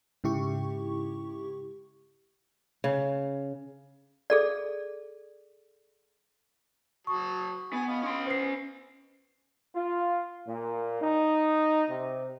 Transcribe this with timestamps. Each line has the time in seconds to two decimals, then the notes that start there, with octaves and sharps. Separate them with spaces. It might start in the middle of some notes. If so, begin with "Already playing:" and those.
0.24 G#2 C#3 E4 G4 C#6
2.84 C#3
4.30 G#4 A4 D5
7.07 F#3 A5 C#6 D#6
7.73 B3 G#5
7.89 D#5 F5 B5
8.03 C#4 C6
8.26 B3 C5 C7
9.75 F4
10.47 A#2
11.02 D#4
11.89 C3